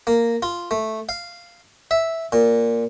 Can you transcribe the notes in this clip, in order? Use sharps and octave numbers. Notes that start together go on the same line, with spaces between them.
A#3
F4
A3
F5
E5
A#2